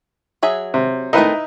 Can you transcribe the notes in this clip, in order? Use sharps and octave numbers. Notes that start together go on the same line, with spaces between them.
F#3 G#4 E5
C3
A3 C4 D#4 E4 A#4 B4